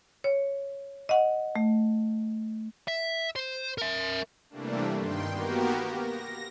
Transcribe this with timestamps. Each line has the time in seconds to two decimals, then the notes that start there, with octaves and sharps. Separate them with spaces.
0.24 C#5
1.09 D#5 F#5
1.56 A3
2.88 E5
3.36 C5
3.78 A#4 E5
4.50 C3 E3 G3 A3 A#3 D4
4.96 G2 D#3 G5 C6
5.32 A#3 B3 F#4 G4 A#4
5.91 A#6